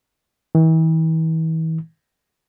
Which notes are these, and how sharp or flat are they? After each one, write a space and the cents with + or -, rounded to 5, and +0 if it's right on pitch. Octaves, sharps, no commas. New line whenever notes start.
E3 -40